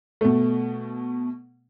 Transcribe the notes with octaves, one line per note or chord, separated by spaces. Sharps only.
B2 A3